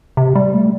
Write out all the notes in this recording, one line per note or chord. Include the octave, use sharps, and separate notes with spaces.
C3
G3
A3